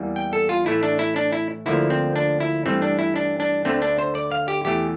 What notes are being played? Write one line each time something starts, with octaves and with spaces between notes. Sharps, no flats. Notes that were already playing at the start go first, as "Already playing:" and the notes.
Already playing: E2 E3 G3 A#3
G5
A4
F4
A2 E3 A3 E4
D4
E4
D4
E4
D2 D3 F3 A#3 E4
C4
D4
E4
G2 E3 A3 C4
D4
E4
D4
D4
D2 D3 A3 C4
D4
C5
D5
F5
G4
E2 E3 A3 G4